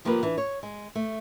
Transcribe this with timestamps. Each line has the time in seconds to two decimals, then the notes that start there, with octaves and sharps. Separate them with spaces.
0.05 D#3 F3 A#3 G4 B4
0.23 E3 D4
0.38 C#5
0.63 G#3
0.95 A3